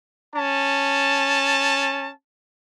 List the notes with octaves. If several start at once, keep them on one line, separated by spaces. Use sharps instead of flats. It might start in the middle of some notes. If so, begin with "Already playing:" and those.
C#4 A5